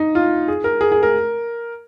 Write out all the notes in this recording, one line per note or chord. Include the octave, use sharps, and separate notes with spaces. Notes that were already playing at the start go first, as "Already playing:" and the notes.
Already playing: D#4
F4
G#4
A#4
G#4
G#4
A#4